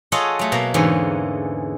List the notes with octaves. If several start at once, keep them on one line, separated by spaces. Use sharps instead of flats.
F4 G#4 A4 C#5 D#5 F#5
F#3 A3
B2 A#3 A#5
E2 G#2 D3 E3 C#4